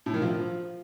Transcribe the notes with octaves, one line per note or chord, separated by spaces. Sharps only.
A2
D#3
F3